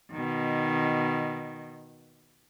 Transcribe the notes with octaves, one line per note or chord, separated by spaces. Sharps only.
B2 D#3